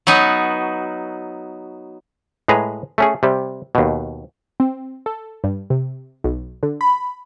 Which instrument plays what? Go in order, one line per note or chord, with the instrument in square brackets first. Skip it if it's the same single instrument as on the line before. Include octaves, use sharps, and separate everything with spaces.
[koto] F#3 B3 D#4 F#4
[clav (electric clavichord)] A2 G#3 G#4 B4 A#5
A3 C#4 G#4
C3 G3
D#2 B2
[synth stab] C4
A4
G2
C3
B1
D3
B5